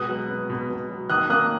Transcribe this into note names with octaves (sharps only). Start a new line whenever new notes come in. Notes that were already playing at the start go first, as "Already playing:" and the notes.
Already playing: B2 G#3 D#6 F#6
F#3
B3
B2
B2
F#3
D#3 D#6 F#6
A#3 D#6 F#6